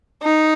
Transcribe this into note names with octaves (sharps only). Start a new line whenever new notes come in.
D#4